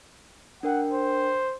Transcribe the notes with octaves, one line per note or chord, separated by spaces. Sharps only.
D4 A#4 F#5 G5
C5